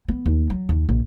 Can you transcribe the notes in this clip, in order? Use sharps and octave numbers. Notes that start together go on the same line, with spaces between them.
B3
D#2
F#3
D#2
A#1